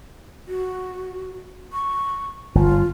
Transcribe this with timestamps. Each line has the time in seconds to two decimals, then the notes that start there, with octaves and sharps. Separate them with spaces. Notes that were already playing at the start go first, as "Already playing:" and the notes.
0.48 F#4
1.73 C#6
2.55 G1 F4